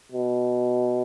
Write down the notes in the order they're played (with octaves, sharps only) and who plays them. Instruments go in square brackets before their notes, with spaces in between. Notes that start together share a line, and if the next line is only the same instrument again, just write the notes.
[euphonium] B2